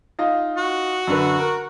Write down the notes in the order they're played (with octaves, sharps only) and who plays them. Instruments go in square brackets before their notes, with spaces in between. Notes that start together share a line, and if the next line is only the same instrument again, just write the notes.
[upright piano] D#4 F4 D#5
[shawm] F#4
[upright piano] F#2 D3 B4
A#4